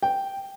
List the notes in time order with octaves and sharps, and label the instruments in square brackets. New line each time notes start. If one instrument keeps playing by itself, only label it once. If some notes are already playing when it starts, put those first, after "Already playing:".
[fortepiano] G5